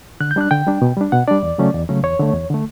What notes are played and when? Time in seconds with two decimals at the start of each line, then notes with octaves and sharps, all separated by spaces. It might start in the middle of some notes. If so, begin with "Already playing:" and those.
0.20 D3 F#6
0.31 G6
0.36 G3 D4 F#6
0.51 D3 G5
0.67 G3 D4
0.82 B2
0.97 G3 D4
1.12 B2 F#5
1.28 G3 D4 D5
1.43 E2
1.58 C#3 F#3 A3 C#4
1.74 E2
1.89 C#3 F#3 A3 C#4
2.03 E2 C#5
2.19 D3 A3
2.34 E2
2.50 D3 A3